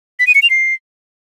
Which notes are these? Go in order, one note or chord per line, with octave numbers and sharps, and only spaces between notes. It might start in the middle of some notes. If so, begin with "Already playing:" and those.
B6
D#7
C#7
F7
C7